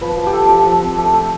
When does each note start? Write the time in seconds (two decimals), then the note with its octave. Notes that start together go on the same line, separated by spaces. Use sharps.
0.01 F3 B4
0.17 F3
0.26 G4
0.33 B3 A4
0.49 F3 G4
0.65 F3
0.81 C4
0.98 A3
1.13 A3